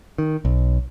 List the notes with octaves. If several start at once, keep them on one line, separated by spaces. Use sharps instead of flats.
D#3
B1